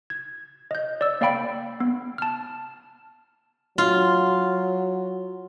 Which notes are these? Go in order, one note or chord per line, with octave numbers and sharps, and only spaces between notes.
G#6
D#5 G6
D5 E6
A#3 D5 F5 G5 B5 D7
B3
A5 F6
F#3 F4